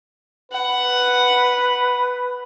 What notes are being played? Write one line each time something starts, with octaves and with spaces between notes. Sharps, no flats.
B4 F#5